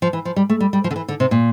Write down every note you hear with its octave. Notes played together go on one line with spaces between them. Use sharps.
F3
E3
F3
G3
A3
G3
G3
F3
D3
E3
D3
C3
A#2